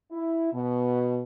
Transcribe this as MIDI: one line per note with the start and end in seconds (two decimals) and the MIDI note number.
0.12 0.51 64
0.53 1.22 47